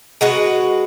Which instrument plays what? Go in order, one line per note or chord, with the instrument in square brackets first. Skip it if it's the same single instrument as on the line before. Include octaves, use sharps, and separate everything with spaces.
[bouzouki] G#3 F#4 B4